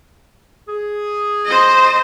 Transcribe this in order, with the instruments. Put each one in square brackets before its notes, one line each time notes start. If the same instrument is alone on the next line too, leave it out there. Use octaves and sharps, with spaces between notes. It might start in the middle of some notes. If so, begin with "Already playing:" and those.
[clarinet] G#4
[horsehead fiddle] C5 D#5